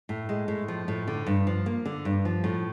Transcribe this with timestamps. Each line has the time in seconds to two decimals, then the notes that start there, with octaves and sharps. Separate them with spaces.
0.09 A2
0.29 G#3
0.48 A2
0.68 F3
0.88 A2
1.07 D3
1.26 G2
1.47 F3
1.66 A#3
1.85 D3
2.05 G2
2.25 F3
2.44 A2